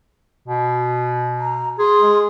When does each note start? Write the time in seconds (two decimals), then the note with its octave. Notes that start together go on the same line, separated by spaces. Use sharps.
0.48 B2
1.39 A#5
1.79 G#4 C6
2.01 G#3